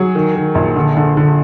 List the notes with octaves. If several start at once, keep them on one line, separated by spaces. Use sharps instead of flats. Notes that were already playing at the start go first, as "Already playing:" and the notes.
Already playing: F#3 G#4
D#3
D#3
A#1
D3
D3
D3